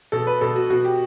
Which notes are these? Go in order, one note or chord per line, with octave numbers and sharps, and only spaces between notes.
B2 A4
B4
B2 A4
F#4
B2 F#4
G4